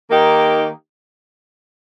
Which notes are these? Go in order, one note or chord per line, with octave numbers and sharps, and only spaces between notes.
D#3 A#3 D#4 G4